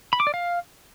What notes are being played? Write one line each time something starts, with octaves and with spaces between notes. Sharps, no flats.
B5
D6
D5
F5